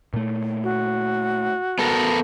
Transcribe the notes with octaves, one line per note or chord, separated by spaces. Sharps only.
A#2 A3
F#4
B3 A4 A#4